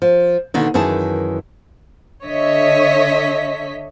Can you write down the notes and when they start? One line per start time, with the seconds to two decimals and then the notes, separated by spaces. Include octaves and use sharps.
0.02 F3
0.54 B2 D3 D#3 A#3
0.74 F#2 D#3 E3 G#4 A5
2.24 D3 C#5 D#5 E5 B6